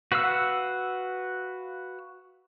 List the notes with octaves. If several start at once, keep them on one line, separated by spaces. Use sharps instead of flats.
F#4 B4 F5 F#5 E6